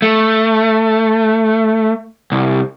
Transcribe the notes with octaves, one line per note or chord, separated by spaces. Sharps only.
A3
C2